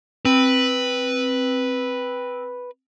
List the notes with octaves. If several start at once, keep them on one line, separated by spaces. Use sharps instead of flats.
C4 B4